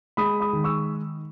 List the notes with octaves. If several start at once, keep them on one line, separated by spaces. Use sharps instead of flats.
G#3 B5 D#6
B5 D#6
D#3
C#6 E6